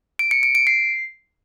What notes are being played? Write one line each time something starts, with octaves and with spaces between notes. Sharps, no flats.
D7
C#7
D7
D7
C7